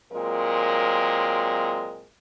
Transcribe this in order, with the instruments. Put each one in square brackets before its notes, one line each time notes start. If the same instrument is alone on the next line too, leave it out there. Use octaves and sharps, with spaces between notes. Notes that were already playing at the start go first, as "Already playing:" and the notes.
[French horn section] A#2 F#3 G#3 C4 A#4